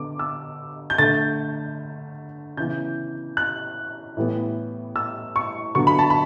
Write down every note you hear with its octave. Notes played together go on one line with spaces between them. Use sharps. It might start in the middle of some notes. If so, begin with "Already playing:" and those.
Already playing: D3 B3 D6
E6
G6
D3 A3 A6
C#3 E3 B3 G6
F#6
A2 E3 G3 B3
E6
C#6
D3 F#3 B3 C#6
B5
A5
B5